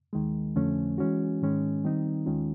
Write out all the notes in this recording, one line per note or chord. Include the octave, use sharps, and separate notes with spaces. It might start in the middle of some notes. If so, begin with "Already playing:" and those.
D#2 D#3 G#3
F2 D3 F3 A3 C#4
E3 G#3 C#4 F#4
G#2 D#3 G#3 C#4
D#3 G3 C4 D#4
D#2 D#3 G#3 C#4 F4